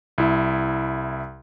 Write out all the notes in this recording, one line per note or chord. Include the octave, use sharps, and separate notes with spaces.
C2 E4